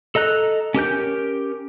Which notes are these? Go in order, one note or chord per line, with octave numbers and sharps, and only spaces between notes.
A4 D#5 A#5 F#6
C#4 G4 A#4 G6